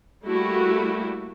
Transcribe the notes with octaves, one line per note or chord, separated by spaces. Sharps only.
G3 A3 A#3 E4 F#4 G4